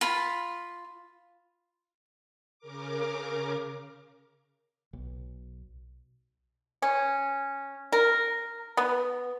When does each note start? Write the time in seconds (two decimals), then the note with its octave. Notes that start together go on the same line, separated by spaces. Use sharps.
0.01 F4 B5
2.59 C#3 A#4 D6
4.93 B1
6.82 C#4
7.92 A#4
8.77 B3